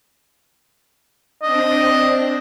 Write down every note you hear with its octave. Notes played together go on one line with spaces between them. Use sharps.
C4 D4 D#5